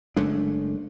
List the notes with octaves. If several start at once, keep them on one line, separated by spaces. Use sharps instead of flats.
F#1 G#3 A3 D4